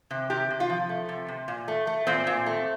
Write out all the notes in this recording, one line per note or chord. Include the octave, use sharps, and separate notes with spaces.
C3
C3 G4
C3
F4
F3
A3
C3
C3
A#2
A3
A3
A#2 C4
A#2
A3